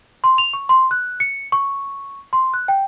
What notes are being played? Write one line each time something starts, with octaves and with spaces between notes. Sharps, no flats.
C6
F7
C#6
C6
F#6
C#7
C#6
C6
F#6
G5